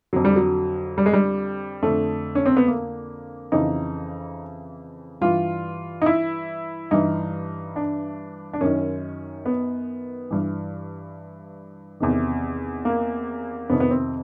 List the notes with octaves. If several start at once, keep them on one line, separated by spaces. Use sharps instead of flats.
F2 D3 F#3
G3
F#3
G3
G#3
G3
F2 D3 A3
C#4
C4
B3
A#3
F2 C#3 E3 D#4
G2 E3 F4
D#4
E4
G2 E3 D#4
D4
D4
F#2 D#3 C#4
B3
G2 E3
E2 C3 D#3
A#3
F2 C3 D#3 B3
B3
C4